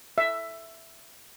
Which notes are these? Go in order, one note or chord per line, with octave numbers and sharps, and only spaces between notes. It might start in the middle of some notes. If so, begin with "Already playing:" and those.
E5